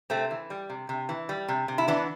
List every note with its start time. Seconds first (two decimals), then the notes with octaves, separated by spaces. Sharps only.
0.10 C3 A3 C4
0.31 E3
0.50 G3
0.70 C3
0.89 C3
1.09 E3
1.29 G3
1.48 C3
1.68 C3
1.78 E4
1.88 E3 B3 D4